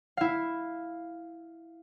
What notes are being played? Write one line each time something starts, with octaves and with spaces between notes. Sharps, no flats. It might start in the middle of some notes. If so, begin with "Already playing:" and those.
E4 F5